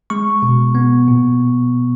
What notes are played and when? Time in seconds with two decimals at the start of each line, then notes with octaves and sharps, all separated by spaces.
0.10 G#3 C#6
0.43 B2
0.75 B3
1.08 A#2